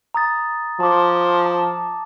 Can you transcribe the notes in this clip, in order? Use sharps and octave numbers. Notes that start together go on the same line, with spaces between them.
A#5 D#6 A6
F3 A5 D6
A5